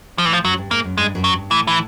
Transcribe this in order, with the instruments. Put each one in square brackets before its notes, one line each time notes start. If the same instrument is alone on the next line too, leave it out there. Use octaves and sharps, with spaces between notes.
[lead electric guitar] F3
[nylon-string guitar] A2 [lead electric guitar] E3
[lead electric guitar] F3
[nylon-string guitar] F#2 [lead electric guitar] F#3
[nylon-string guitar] G2
[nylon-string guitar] G#2 [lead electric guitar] A#3
[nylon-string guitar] F#2
[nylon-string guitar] G2 [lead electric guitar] G#3
[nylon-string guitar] F#2
[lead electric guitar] F#3
[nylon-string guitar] G2
[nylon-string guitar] A2 [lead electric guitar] E3
[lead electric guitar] E3